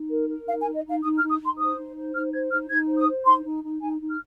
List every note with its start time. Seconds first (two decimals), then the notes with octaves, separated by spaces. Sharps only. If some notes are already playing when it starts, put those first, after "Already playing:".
Already playing: D#4
0.10 A#4
0.29 A#4
0.47 D#4 F5
0.61 G#5
0.65 D#4
0.75 D#5
0.84 D#4 F5
1.03 D#4 D#6
1.17 F6
1.22 D#4
1.30 D#6
1.40 D#4 C6
1.58 C5 D#6
1.77 D#4
1.96 C5
2.15 D#4 F6
2.33 C5 G#6
2.51 D#4 F6
2.70 D#4 G#6
2.88 C5
2.97 D#6
3.08 C5
3.25 D#4 C6
3.44 D#4
3.63 D#4
3.81 D#4 G#5
4.00 D#4
4.10 F6